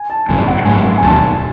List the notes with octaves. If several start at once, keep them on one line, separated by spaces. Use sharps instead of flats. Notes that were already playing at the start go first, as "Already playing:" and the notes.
Already playing: G#5
A5
G#1 F#2 C#3 G#5
F#5
G#2 F#3 A3 G#5
G#5
E1 D#2 D#3 A5